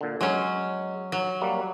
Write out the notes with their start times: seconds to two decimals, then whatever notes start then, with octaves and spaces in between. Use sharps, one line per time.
0.01 A#2 D3
0.21 F#3 G#3 C#4
1.12 F#3
1.41 G3 A#3